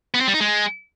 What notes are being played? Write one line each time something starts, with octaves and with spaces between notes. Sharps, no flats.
B3
C4
G3
D#4
G#3